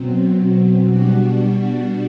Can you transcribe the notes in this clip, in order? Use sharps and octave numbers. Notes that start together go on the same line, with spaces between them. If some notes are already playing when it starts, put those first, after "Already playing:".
Already playing: B2 F#3 C4
B2 G3 D4 F#4